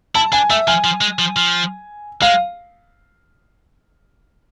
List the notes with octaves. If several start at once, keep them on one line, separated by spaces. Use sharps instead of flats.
E4 A5
D4 G#5
A3 E5
F3 G#5
F3
G#3
F3
F3
G#3 F5